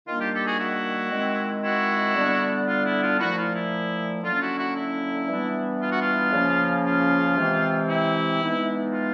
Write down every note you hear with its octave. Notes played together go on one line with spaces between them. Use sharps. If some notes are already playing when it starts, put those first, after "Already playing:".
D#3 G3 A#3 D4 F4
F4 G4
G4 A4
F#4 G#4
E4 F#4
D#3 G#3 C4
E4 F#4
D3 G3 B3 D4
F4
E4
F4
A#2 F3 A3 E4 F#4
F4
E4
D3 F#3 A#3 C#4 F4
E4 F#4
E4 F#4
E4
E3 G3 B3 D4
F4
F#4
F4
C#3 F3 A#3 C#4
F4
C3 E3 G#3 C4
E4
E3 G#3 B3 D#4
F4